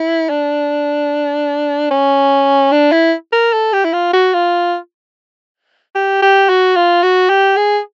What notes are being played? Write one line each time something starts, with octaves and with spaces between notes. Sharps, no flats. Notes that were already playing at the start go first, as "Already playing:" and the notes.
Already playing: E4
D4
C#4
D4
E4
A#4
A4
G4
E4
F4
F#4
F4
G4
G4
F#4
F4
F#4
G4
G#4